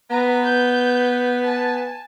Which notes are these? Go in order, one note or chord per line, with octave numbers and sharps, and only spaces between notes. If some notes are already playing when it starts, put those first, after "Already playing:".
B3 B4 A#5
G6
G#5 A5